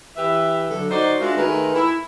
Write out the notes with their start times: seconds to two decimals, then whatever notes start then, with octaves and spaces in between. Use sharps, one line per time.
0.16 E3 G4 B4 E5
0.70 D3 F#3 A4
0.90 D#4 F#4 C5 D5 D#5
1.20 G#3 D4 F4 F#4 A#4 E5
1.37 D#3 G#3 A3 A#4 B4
1.75 E4